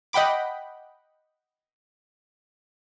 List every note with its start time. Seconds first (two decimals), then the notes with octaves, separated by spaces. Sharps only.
0.13 D#5 F#5 G5 B5 D6